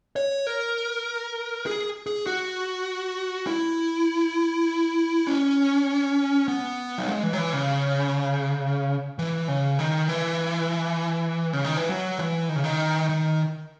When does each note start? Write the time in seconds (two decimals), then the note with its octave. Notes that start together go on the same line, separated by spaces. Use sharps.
0.16 C#5
0.47 A#4
1.66 G#4
2.07 G#4
2.26 F#4
3.47 E4
5.27 C#4
6.48 B3
6.98 F#3
7.07 G#3
7.23 E3
7.33 F#3
7.38 E3
7.53 C#3
9.19 E3
9.48 C#3
9.79 D#3
10.08 E3
11.53 C#3
11.64 D#3
11.77 E3
11.89 F#3
12.19 E3
12.49 D#3
12.56 C#3
12.64 D#3
13.09 D#3